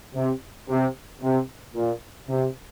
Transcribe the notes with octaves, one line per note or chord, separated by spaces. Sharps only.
C3
C3
C3
A#2
C3